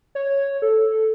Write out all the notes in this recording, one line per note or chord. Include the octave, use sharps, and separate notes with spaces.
C#5
A4